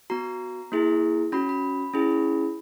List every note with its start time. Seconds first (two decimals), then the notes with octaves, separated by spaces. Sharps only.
0.10 B3 F#4 A#5
0.72 A#3 E4 G#4
1.32 C#4 F#4 B5
1.49 B5
1.94 C#4 E4 G#4